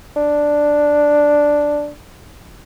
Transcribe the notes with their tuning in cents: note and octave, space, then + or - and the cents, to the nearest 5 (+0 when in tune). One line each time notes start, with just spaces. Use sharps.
D4 +0